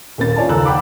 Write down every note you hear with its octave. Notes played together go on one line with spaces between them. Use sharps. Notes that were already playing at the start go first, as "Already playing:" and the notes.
D#1 A#3 C#4 A6
F4 C#5 D5 G#5 A5
F#1 D#2 A4 A#5 E6 F#6
F#5 G5 B5 D6